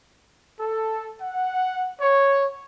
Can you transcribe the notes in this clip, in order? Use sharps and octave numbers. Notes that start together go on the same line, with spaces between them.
A4
F#5
C#5